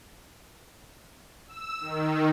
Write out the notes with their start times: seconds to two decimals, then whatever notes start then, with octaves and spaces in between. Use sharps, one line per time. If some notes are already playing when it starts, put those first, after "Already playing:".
1.47 E6
1.81 D#3